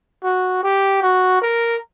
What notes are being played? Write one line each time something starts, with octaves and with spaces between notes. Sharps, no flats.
F#4
G4
F#4
A#4